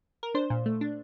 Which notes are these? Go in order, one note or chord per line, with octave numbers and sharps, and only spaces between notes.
A#4
D4 C5
A#2
A3
D4